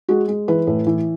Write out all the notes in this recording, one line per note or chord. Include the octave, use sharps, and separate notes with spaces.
G#3 F#4
G#3
E3 B4
A2
E3